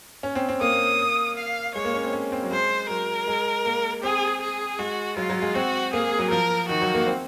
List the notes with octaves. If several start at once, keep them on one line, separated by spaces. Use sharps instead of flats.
C#4
C4
C4
A#3 D#6
F5
G#3 C#5
A#3
C#4
C4
C#4
C4
F#3
G#3 C5
F#3 A#4
G#3
A#3
C4 G#4
G#4
G#3 F#4
F#3 F4
F#3
G#3
C4 F#4
A#3 G#4
F#3
F3 A#4
D#3 F#4
F#3
A#3
C4